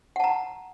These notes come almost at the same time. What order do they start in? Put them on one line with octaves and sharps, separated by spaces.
F#5 A5 A#5